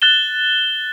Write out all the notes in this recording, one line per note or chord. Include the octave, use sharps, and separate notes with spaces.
F#6 A6 E7 G7